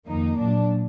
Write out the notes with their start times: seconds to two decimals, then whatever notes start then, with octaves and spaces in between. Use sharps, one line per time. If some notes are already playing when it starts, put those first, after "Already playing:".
0.08 F2 D#3 A#3 D#4
0.38 A#2 F#3 D4